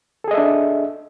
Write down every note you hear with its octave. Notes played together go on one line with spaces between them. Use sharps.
D4 G#4 A4 D#5 E5